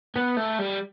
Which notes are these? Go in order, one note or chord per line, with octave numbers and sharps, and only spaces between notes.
B3
A3
G3